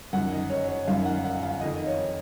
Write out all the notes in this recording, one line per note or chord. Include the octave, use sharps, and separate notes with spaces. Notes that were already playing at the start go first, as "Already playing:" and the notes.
F#2 D#3 F#5
D#5
C#5
C#5
F#2 D#3 F5
F#5
F#5
F5
F2 D#3 D#5
C#5